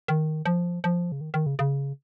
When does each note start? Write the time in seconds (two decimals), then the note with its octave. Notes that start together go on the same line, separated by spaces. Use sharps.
0.08 D#3
0.46 F3
0.84 F3
1.12 C#3
1.21 D#3
1.34 D#3
1.46 C#3
1.59 C#3